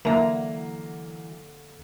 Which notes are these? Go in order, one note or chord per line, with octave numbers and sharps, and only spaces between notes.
D3 E3 F#3 A#3 E5 A#5